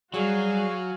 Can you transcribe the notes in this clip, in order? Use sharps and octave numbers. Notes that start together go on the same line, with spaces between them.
F#3 G3 F#4 G#4 F5 G#5